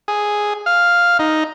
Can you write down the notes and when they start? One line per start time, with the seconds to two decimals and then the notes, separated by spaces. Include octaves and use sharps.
0.08 G#4
0.66 F5
1.19 D#4